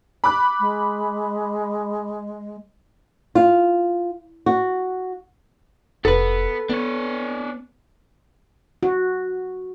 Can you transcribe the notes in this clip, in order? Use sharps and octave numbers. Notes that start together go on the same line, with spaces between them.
B5 D6 F#6
G#3
F4
F#4
F1 B3 A4 B4
B3 D4 C#5
F#4